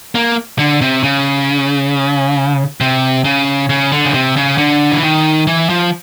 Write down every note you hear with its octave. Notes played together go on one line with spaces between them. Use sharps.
A#3
D3
C3
C#3
C3
C#3
C#3
D3
C#3
C3
C#3
D3
E3
D#3
E3
F3